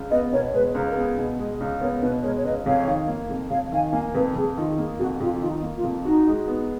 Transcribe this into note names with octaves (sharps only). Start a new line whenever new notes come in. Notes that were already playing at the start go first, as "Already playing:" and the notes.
Already playing: C#2
B3 B4 D#5
B2 A#4 C#5
G#3 B4
C#2 A#4
A#4
B3 G#4
B2
G#3
C#2
B3 A#4 C#5
B2 B4 D#5
G#3 A#4 C#5
C#5
C#2 B4 D#5
F2 C#5 F5
D#3
A#3
F2
F2 C#5 F5
D#3 F5 G#5
A#3 F5 G#5
F2 B4
F2 G#4
D#3 F4
A#3 G#4
F2 F#4
F2 F4
D#3 F4
D#4
A#3
F4
F2
D#4 F#4
G#3
B3